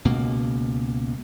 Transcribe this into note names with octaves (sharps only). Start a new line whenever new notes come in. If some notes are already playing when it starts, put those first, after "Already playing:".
C#2 B2 A#3